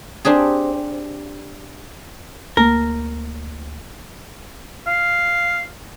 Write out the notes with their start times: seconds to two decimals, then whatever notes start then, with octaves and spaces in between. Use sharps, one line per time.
0.25 C4 D4 G4 G#4
2.57 D2 A#3 A#4
4.87 F5